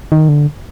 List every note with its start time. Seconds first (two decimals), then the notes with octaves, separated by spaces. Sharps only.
0.12 D#3
0.29 D3